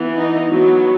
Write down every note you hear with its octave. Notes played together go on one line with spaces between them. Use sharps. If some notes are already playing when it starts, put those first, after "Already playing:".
Already playing: E3 B3
D#4
F#3 B3